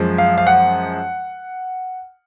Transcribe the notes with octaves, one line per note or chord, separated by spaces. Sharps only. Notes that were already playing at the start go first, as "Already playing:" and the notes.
Already playing: F#2 F3 G#3
F5
F5
F#5